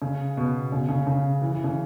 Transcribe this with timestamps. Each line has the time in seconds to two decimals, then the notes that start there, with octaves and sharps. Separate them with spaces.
0.02 C#3
0.37 B2
0.72 C#3
0.89 C#3
1.07 C#3
1.42 E3
1.52 E3
1.64 C#3